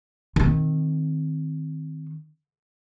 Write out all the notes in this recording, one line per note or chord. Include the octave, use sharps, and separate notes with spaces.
D#3 C4